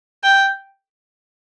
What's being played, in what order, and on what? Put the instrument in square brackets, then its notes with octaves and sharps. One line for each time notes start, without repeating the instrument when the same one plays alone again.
[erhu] G5